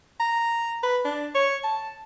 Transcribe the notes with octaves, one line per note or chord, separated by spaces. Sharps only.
A#5
B4
D4
C#5
A5